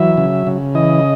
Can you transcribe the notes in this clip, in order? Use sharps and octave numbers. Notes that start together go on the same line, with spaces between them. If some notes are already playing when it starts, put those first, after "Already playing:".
Already playing: E3 F#3 E5
C#3
C#3
E3 D#5